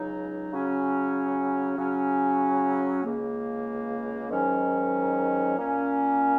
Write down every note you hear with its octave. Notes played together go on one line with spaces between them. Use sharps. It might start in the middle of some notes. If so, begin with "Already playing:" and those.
Already playing: C#2 C#3 F#3 D#4
C#3 F#3 C#4
C#3 F#3 C#4
C#2 C#3 A#3
G#2 D#3 F#3 C#4
A#2 A#3 C#4